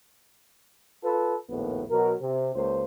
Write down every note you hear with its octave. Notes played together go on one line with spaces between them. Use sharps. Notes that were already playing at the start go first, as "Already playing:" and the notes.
F4 A4 B4
A#1 D#2 A2 B3
B2 F#3 A#4
C3
C#2 A#3 C5